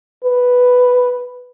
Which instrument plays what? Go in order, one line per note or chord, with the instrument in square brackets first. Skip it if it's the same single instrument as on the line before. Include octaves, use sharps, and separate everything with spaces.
[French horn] B4